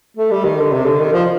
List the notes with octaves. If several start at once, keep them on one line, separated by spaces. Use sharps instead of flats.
A3
G3
D#3
D3
C3
D3
D#3
F3